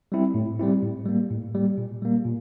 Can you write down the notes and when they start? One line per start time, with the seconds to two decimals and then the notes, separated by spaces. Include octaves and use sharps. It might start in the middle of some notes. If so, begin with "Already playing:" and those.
0.12 G3 C4 E4
0.34 A2
0.59 G3 C4 E4
0.83 A2
1.06 G3 A#3
1.30 A2
1.55 G3 A#3
1.78 A#2
2.02 G3 A#3
2.25 A#2